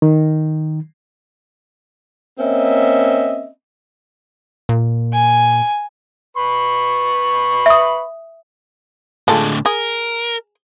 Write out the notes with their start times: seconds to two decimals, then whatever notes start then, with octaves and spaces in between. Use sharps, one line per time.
0.02 D#3
2.39 A#3 C4 C#4 D#5 E5
4.69 A#2
5.13 G#5
6.37 B4 B5 C#6
7.66 E5 D#6
9.28 A2 D3 G#3 F4 A4
9.66 G#4 A#4